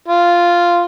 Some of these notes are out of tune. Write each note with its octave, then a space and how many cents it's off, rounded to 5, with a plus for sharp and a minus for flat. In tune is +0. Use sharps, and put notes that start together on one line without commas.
F4 -5